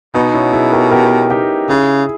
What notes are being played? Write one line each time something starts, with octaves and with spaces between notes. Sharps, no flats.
B2 B3 D#4
C#4 E4
E4 G#4
G4 A#4
G4 A#4
D#4 G4
C#3 E4 G#4